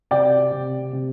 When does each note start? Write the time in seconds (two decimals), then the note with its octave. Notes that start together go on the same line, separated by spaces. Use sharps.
0.11 C3 D5 G5
0.52 C3
0.93 C3